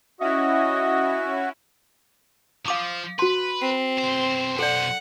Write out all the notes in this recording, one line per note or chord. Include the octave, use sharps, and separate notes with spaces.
C#4 E4 F#4 D#5 E5
F3 F5 D6 D#6
F#4 B4 C6
C4
B1 C5
A4 D5 F#5